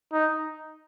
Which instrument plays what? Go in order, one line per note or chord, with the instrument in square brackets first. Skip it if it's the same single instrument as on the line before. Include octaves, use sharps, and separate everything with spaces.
[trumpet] D#4